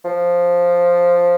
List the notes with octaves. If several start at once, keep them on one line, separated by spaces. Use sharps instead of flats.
F3